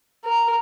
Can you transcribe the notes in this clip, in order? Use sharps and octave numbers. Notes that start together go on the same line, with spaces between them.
A#4